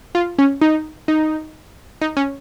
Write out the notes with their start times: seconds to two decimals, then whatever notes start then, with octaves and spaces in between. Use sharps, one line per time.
0.15 F4
0.39 C#4
0.61 D#4
1.08 D#4
2.01 D#4
2.17 C#4